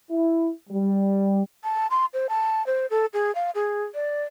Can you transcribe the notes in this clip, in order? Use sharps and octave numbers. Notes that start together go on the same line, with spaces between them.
E4
G3
A5
C6
C5
A5
C5
A4
G#4
F5
G#4
D5